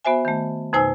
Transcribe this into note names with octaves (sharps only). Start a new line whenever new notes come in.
B3 F#4 C5 E5 G#5
D#3 A3
F2 B2 D#4 C5 G#5 E6